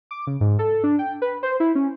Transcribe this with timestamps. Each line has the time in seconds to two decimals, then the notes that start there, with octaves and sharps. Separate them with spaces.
0.11 D6
0.27 C#3
0.41 G#2
0.59 A4
0.84 D4
0.99 G5
1.22 B4
1.43 C5
1.60 E4
1.75 C#4